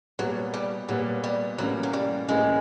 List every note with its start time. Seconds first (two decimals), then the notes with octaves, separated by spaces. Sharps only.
0.19 A#2 F#3 G3 B3
0.54 G3
0.89 A#2 F#3 G3 B3
1.24 G3
1.58 A2 E3 F#3 G3 A#3 C#4
1.83 F#3
1.93 G3
2.28 A2 E3 G3 G#3 A#3 C#4